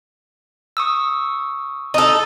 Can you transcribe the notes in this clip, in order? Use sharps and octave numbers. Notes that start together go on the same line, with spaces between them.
C#6 D#6 E6
D#4 A4